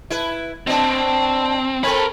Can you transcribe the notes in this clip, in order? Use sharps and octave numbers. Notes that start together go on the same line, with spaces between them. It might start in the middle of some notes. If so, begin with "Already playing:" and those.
E4 B4
B2 C4 D4
C4 A4 A#4 B5